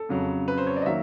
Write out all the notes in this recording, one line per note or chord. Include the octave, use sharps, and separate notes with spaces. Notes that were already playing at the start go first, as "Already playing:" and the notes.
Already playing: A4
F2 C#3 F#3
B4
C5
C#5
D5
D#5
D#3 F#3 A#3 E5